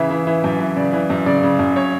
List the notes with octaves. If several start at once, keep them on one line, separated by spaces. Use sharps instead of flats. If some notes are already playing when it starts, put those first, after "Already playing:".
Already playing: C#3 E3 E5
E3
E3
F#2
E3
C#3 D5
E3
F#2
C#3 D5
C#3
F#2
C#5